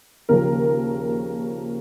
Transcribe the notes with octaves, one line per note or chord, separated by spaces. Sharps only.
D#2 C#3 F3 A#4